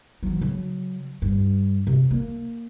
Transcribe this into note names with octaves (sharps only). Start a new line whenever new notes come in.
E3 F#3
C#3 F#3
G2
C3
A#3